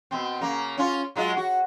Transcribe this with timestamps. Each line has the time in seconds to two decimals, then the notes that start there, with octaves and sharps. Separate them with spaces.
0.11 B2 C4
0.41 C#3 A#3
0.78 C#4 F4
1.16 F#3 G#3 F4
1.37 F#4